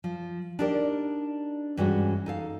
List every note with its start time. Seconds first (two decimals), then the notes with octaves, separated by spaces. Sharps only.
0.04 F3
0.59 D4 D#4 G4 A#4 D5
1.77 G2 E3 G#3 C#4 F#4
2.26 D#4 A4 F5